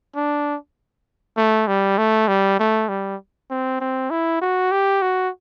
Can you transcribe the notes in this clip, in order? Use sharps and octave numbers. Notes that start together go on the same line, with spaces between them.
D4
A3
G3
A3
G3
A3
G3
C4
C4
E4
F#4
G4
F#4